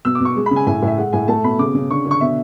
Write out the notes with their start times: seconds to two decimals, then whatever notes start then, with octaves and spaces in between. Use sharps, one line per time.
0.05 B2 E6
0.15 D6
0.20 B2 C#6
0.36 G#3
0.46 C#3 B5
0.56 G#5
0.67 A2 G#5
0.82 A2
0.87 E5
0.98 G#3 F#5
1.13 A2 G#5
1.28 A3 A5
1.44 B2 B5
1.59 C#3 D6
1.75 C#3
1.90 D3 C#6
2.05 D3
2.11 C#6
2.21 B2 E5